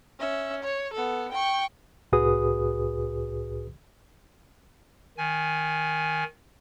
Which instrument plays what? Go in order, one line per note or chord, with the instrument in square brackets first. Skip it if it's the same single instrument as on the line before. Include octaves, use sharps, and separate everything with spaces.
[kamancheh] C#4 E5
C#5
B3 A4
G5 C#6
[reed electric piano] C2 A2 F#4 G#4 B4 D#6
[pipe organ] D#3 G#5